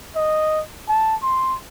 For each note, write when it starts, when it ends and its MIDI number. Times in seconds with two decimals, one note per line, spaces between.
0.16 0.62 75
0.89 1.16 81
1.22 1.56 84